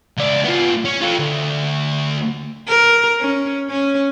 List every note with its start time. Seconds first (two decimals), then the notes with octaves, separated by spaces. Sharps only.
0.17 C#2 D5
0.44 B3 F4
0.85 C#4
1.02 F4 A4
1.19 D2
2.67 A#4
3.20 C#4
3.70 C#4